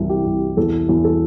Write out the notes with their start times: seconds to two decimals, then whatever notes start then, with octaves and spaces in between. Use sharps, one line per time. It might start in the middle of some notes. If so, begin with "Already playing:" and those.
Already playing: C2 C3 E3
0.10 G4
0.26 C2
0.57 E2 A4
0.89 E2
1.04 A4